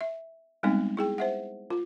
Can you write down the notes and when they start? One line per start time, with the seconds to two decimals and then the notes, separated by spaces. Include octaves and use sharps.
0.01 E5
0.63 G3 G#3 B3 C4 D#4
0.97 E4 G#4 G5
1.18 C5 E5 F#5
1.70 F4